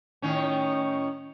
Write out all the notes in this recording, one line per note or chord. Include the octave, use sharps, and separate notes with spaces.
A2 D#3 C#4